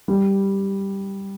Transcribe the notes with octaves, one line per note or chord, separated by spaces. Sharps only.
G3